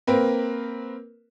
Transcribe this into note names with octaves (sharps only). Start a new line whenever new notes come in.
A#3 C4 A#4 B4